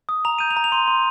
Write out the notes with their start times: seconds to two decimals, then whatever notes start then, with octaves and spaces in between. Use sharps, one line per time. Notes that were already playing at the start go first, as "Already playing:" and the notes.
0.09 D#6
0.25 A#5 F7
0.39 G6 D#7
0.51 F7
0.57 A#5
0.64 F7
0.72 C6 D#7
0.88 C6